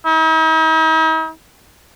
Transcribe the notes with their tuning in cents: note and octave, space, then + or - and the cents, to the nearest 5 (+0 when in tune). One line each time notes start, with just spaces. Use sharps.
D#4 +45